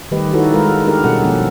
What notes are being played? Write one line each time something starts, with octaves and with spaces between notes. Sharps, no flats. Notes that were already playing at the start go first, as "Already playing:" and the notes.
D#3 G3 A3 G4 B4 D#5
D#4 E4 F#4 A4 B4 C#5
G#3 A#4 B4 F5
D4 G4 A4 A#4
B2 G3 C#4 G#4 A4 F#5
B2 F3 A#3 C#4